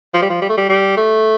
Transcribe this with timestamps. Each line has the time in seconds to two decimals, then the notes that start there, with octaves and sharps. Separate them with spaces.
0.14 F3
0.22 G3
0.30 F3
0.42 G3
0.49 A3
0.57 G3
0.69 G3
0.97 A3